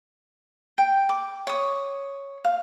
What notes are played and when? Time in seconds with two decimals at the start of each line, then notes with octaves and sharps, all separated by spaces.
0.78 G5
1.09 D6
1.47 C#5 D#6
2.45 F5